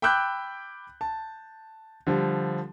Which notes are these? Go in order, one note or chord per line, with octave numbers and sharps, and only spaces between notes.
G5 B5 D6 E6 F#6 G6
A5
D3 F3 G3